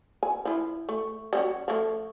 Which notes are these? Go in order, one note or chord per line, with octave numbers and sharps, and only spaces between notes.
G#5
F3 E4
A3
G3 C#4 F#4
F3 A3